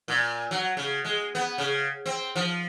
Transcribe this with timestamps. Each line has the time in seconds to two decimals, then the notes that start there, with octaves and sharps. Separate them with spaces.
0.08 A#2
0.51 F#3
0.77 C#3
1.05 G#3
1.35 B3
1.58 C#3
2.06 C4
2.35 F3